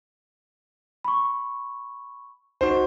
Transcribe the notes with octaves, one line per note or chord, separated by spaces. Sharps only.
B5 C#6
C#2 D#4 F#4 C5